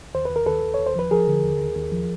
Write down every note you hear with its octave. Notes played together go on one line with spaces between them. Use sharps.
D#2 C5
B4
D#2
A#4
D#2 A4 B4
D#2
D#2 C#5
C5
F3 B4
F3 G#4 A#4
D3
D#2
D#2
D#2
F3